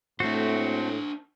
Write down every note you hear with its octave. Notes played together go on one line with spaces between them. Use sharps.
A2 A3 C4 D4 F#4 C5